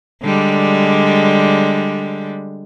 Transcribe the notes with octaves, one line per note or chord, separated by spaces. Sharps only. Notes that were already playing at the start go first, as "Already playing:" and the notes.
D3 G3 G#3